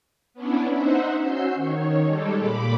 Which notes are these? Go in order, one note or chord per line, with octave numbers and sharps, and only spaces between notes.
B3 C#4 D4 E4
D#4 C5 E5 F#5
C#4 F#4 E6 G6 C7
D#3 C#5
G3 G#3 G4 A4
A#2 B5 D6